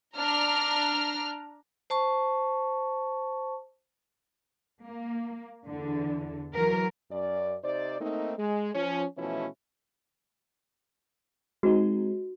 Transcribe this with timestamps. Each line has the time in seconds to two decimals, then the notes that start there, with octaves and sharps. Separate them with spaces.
0.16 D4 A#5 F6
1.90 C5 A5 C#6
4.83 A#3
5.65 E2 D3
6.55 E3 F#3 A#4
7.11 F#2 D5
7.64 C3 D#4 C5 D5
8.00 A3 A#3 C4 D#4
8.38 G#3
8.74 F3 C#4
9.17 B2 E3 F3 A3 C#4 E4
11.63 G#3 C4 D#4 F#4